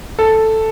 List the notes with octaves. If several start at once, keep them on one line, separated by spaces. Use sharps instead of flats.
A4